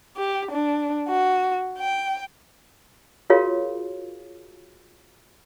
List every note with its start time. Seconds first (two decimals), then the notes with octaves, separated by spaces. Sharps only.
0.16 G4
0.51 D4
1.07 F#4
1.78 G5
3.30 F4 F#4 G#4 A#4 C#5 F5